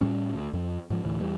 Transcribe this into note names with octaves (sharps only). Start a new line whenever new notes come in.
A2 G3 C#4
D2
F2
G#2 F3
D2 A2 E3
E2 E3 G3